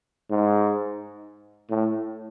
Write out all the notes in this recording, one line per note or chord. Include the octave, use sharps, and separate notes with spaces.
G#2
A2